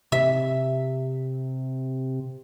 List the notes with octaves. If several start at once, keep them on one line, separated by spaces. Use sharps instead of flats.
C3 E5